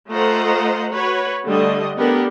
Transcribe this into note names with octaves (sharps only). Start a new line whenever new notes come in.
A3 F4 C5 D#5 F#5 A#5
F#4 B4 C#5
D3 G3 A3 D4 D#5
B3 D4 G4 A4 A#4